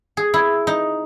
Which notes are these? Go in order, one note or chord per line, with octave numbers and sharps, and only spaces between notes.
G#4
E4
D#4